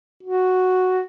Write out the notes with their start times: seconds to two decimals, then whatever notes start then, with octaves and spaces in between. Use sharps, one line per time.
0.23 F#4